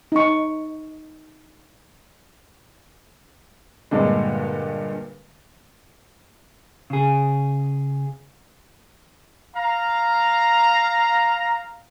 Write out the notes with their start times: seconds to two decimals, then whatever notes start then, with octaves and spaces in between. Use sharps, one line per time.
0.12 D#4 C#6
3.91 G2 A#2 D3 G#3
6.90 C#3 G#4
9.55 F5 A#5